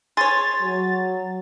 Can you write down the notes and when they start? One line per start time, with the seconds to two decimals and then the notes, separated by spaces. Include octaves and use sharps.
0.17 G#4 C#5 C6 A6
0.62 F#3